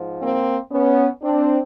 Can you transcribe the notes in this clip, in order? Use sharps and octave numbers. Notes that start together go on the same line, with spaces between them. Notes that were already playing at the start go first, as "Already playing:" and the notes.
Already playing: G#2 F3
A#3 C4
B3 C#4
C4 D4